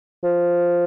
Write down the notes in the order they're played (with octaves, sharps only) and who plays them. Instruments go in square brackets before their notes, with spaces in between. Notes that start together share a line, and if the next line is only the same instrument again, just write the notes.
[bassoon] F3